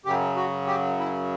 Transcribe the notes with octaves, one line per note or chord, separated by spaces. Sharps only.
F#2 C#3 F#3 G4
F#4
G4
E4